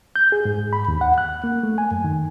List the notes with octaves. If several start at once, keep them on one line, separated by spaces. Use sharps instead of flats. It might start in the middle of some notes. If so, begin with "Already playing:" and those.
G6
G#4
G#2
B5
D#2
F#5
F#6
A#3
A3
G#5
F#2
D#3